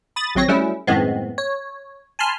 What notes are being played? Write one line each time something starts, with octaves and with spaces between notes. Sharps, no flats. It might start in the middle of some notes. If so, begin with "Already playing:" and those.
B5 D#6 A6
G#1 F#3 C4 C#5 A#6
F#3 G3 A3 C#4 E4
F#2 A2 D#3 G#3 B3 C4
C#5
G#5 A5 B5 C6 F6